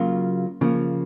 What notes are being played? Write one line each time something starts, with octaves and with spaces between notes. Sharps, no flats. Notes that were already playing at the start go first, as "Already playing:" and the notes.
Already playing: C#3 F#3 A#3 F4
C#3 F3 A#3